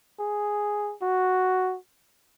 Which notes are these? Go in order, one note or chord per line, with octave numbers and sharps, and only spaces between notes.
G#4
F#4